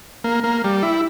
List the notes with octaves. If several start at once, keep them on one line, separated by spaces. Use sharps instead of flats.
A#3
A#3
G3
E4